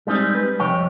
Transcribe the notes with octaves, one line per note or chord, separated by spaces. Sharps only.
G3 G#3 C4 D#4
B4
C2 F2 C#5 G5